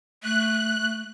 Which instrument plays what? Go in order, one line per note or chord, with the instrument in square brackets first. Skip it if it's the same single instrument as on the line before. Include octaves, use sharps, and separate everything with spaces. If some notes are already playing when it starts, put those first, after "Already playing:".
[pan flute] A3 [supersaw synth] F#6